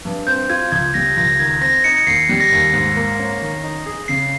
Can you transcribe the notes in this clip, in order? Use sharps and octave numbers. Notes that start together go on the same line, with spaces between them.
G2
C4 G6
F4 G#6
C#2 G#6
G3 A#6
C#2 A#6
D#3 G#6
C4 A#6
D#4 C#7
C#7
D#2 C7
G3
A#6
D#2
G#2
A#3
C#4
D#3
D#4
G#4
C#3 C7